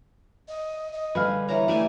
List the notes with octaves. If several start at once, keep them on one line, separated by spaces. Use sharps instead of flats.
D#5
D#5
D3 G3 G#4 B4 F5
E3 C#5 A#5
G3 A3 E4 D5 G#5